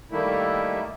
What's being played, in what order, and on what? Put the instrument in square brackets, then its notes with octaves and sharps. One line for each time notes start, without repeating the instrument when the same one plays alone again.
[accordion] D#3 G3 A3 A#3 E4